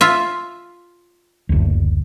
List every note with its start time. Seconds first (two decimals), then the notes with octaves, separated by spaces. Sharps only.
0.01 F4 E5
1.49 F#1 D2